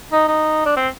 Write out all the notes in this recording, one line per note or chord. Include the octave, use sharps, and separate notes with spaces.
D#4
D#4
D4
C4